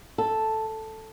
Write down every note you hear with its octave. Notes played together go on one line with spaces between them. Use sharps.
A4